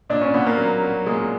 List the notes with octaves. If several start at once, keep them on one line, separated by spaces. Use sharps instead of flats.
A#2 D4
C#4
A#2 B3
A#3
F#3
F#3
A#2 G#3